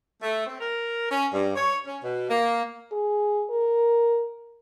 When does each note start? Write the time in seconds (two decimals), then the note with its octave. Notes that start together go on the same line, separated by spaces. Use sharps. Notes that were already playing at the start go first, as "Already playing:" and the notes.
0.23 A3
0.47 C4
0.61 A#4
1.11 C#4
1.34 G2
1.56 C#5
1.86 C#4
2.04 B2
2.30 A#3
2.92 G#4
3.50 A#4